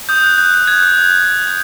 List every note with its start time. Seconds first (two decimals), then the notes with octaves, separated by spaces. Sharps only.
0.09 D#6 G6
0.23 F#6
0.38 F#6 G6
0.54 F#6
0.67 F#6 G#6
0.83 D#6
0.98 F#6